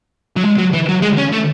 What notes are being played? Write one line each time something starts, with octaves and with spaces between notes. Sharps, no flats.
F#3
G#3
F#3
E3
F#3
G#3
C#4
A3